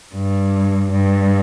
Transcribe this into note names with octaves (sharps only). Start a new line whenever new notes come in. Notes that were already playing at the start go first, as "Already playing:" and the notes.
G2
G2